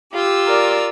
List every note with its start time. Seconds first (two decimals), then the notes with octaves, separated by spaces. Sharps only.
0.13 F4 G4 E6
0.47 A#4 D5